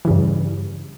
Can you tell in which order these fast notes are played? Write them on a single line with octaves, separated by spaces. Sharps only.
E3 C#3 G2